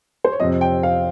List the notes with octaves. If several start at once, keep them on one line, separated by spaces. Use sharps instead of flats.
C5
C#5
F2 C3 F3 C4 D#5
G5
F5